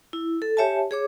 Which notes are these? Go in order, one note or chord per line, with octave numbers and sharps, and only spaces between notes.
E4
A4
G4 C#5 E5 G#5 A5
G#4 C#5 D6